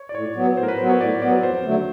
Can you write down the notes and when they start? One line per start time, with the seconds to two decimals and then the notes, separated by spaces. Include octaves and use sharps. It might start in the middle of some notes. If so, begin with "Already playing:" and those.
Already playing: C#5
0.09 D5
0.15 A2 C#5
0.36 F#3 B3
0.57 A2 C5
0.63 A#4
0.68 B4
0.78 F#3 B3 C5
0.90 C#5
1.01 A2 D5
1.22 F#3 B3 D5
1.43 F2 C5
1.65 D3 F#3 A3